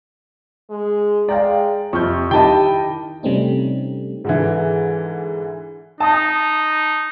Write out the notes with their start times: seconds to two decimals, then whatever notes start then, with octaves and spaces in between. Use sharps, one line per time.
0.70 G#3
1.29 G#3 D5 F5 G5 A#5
1.93 F2 C3 C#6 F6 G6
2.31 D#3 E4 G4 D#5 G5 A5 B5
3.23 C3 G3 A3 C4 C#4 D#4
4.24 G#2 D3 E3
6.00 D#4 A5 D#6